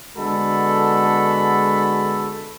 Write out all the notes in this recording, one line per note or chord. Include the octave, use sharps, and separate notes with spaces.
D3 G#3 B3 F#4 A4 B5